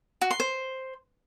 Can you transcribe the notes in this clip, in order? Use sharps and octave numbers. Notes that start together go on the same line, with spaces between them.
F#4
C6
C5